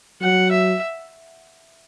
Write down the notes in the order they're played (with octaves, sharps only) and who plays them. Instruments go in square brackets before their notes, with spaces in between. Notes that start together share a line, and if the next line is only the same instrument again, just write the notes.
[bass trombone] F#3 [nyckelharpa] F#5
[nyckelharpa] E5